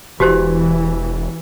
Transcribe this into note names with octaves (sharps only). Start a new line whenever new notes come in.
E1 E3 F#4 G4 C5